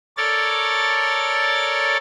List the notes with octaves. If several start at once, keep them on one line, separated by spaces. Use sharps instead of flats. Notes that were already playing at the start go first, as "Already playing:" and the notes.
A4 A#4 C#5 D5 A6